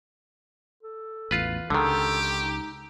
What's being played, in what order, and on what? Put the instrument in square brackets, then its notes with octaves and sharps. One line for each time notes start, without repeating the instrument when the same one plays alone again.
[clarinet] A4
[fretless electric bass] A1 E2 [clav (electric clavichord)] F4 B4
[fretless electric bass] C#2 G#3 [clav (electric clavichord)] D3 D#3 [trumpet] G4 [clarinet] A4
[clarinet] D#4